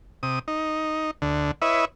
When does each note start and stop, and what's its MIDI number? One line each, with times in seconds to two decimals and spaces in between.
0.23 0.39 48
0.23 0.39 87
0.48 1.11 63
1.22 1.51 38
1.22 1.51 50
1.62 1.85 64
1.62 1.85 71
1.62 1.85 73
1.62 1.85 75
1.62 1.85 76